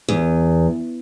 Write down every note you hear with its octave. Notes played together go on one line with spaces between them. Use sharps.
E2